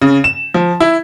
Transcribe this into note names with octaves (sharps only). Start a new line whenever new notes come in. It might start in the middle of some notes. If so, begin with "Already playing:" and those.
C#3
E7
F3
E4